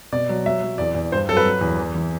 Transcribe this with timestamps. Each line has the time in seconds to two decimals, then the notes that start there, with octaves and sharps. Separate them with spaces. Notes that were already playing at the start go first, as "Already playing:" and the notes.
0.12 B2 D5
0.29 F#3
0.46 F#3 E5
0.63 F#3
0.78 E2 D5
0.95 E2
1.12 G2 C5
1.28 F#3 A4
1.37 B4
1.45 F#3
1.61 E2
1.78 E3
1.95 E3